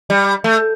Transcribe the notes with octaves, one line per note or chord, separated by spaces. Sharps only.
G3
A3